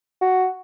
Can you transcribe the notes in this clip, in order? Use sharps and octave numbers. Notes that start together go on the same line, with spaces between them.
F#4